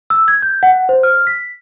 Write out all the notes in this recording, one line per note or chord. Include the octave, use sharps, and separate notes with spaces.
E6
G#6
G6
F#5
C5
F6
B6